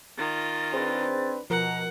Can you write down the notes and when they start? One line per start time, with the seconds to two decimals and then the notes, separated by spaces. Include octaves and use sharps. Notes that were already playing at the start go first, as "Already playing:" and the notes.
0.18 D#3 F4 A6
0.73 C4 D4 G#4 B4 C5
1.50 B2 F3 A#4 F#5 A#5